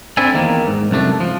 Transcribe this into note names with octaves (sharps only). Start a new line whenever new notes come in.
C4 D4 E4 A4 G#5
E2 D#3 A#3
G#2
C2 F#2 A3 D4
F3